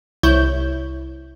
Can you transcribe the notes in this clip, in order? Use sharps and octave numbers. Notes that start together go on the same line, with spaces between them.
C2 E4 C#5 G6